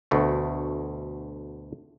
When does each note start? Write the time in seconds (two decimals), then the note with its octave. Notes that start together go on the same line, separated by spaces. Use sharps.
0.11 D2 B2 A3